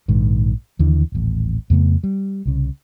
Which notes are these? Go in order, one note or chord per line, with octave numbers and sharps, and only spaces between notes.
A#1 G#2 D#3
D#2 D3 E3
D#1 A1
F2 C#3 A3 B3
G3
C2 C#3